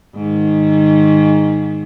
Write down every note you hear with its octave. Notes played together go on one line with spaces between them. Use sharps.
G#2 D#3